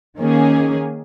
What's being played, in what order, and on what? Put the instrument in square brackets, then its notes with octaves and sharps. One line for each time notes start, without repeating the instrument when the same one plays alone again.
[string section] D#3 A#3 C#4 G#4